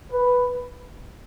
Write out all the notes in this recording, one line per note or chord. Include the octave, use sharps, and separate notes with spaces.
B4